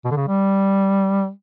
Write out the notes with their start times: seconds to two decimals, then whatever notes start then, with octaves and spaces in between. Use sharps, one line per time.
0.05 B2
0.11 D3
0.16 C#3
0.28 G3